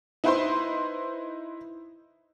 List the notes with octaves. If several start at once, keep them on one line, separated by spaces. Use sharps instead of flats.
D#4 E4 B4 C5 E5 C6